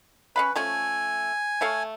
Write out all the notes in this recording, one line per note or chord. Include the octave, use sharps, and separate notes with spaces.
C#4 B4 F5 B5
F3 A3 C#4 G#5
A3 C#5 F5